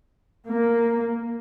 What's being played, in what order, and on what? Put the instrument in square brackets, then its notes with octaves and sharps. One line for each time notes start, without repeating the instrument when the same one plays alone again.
[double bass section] A#3